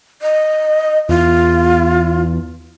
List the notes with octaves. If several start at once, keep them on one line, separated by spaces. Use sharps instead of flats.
D#5
E2 F4